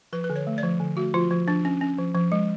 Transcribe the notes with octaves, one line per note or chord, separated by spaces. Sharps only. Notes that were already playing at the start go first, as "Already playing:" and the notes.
F3 B4
B4
D3
C#5
A3
D5
F3
D3
A3 F#4
F3 F4
F3
F3 D4
C#4
C#4
F3
F3
G#3